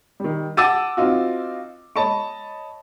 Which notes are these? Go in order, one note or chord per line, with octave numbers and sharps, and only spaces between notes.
D#3 G3
F#5 A5 D6 E6 A6 D#7
C4 D#4 F4 F#4
C#5 D#5 A5 B5 C#6